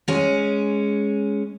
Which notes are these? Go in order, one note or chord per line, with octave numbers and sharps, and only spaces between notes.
G#3 C#4